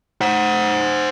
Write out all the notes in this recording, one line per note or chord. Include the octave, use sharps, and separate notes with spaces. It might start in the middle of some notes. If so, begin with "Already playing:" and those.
C5 F#5